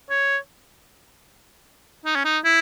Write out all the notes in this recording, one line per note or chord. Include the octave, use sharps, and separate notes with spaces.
C#5
D#4
C#4
D#4
E4